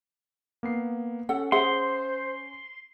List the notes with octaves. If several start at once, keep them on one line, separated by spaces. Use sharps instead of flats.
A#3 B3 C7
C#4 A4 F#5
G#4 C5 E5 F#5 C6